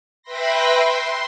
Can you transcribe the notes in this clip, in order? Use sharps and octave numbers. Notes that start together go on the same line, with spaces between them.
B4 E5 G5 B5 C6 A#6
C6